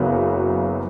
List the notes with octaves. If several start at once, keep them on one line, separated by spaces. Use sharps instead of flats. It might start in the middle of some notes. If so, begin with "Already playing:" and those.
Already playing: F#1 F#2 C#3 F#3 B3